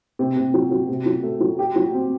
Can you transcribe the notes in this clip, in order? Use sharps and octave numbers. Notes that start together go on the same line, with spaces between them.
C3
C3
F#3
F#3
C3
F#3
A3
F#3
G4
F#3
C4